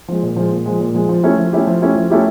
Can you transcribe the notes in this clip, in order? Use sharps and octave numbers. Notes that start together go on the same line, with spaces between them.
F3 G#3
A#2
F3 G#3
A#2
F3 G#3
A#2
F3 G#3
F3
A3 C#4 E4 G4
F3
A3 C#4 E4 G4
F3
A3 C#4 E4 G4
F3
A3 C#4 E4 G4